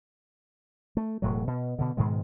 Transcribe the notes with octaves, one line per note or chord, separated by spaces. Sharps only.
A3
E1 A2 F#3
B2
B2 D3
G#2 B2 D#3 G#3